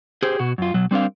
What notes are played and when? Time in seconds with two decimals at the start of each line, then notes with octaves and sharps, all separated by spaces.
0.22 G4 G#4 C5
0.39 B2 F#4
0.58 F#2 F4
0.74 B2 F#3
0.91 G3 C4 D4 A#4 F5